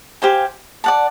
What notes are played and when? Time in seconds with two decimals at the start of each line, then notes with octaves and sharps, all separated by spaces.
0.22 G4 C5 F5 G#5
0.84 D5 F#5 A5